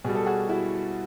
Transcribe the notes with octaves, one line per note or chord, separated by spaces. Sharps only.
B2 G3 G#4
A4
F#4 G#4
E4 F#4